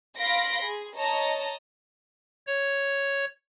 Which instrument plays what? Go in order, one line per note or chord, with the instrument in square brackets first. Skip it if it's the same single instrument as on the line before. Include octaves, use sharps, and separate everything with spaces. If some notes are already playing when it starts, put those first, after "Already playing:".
[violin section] F5 B5 C6 A#6 D7
G#4
C#5 D#5 A5 A#5
[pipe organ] C#5